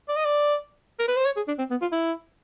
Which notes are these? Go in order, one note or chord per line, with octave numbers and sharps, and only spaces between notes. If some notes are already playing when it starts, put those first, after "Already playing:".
D5
D#5
D5
A#4
B4
C5
C#5
G#4
D4
C4
B3
F4
E4